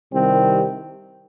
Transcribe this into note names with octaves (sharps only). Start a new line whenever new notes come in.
C2 C3 D#3 G3 C4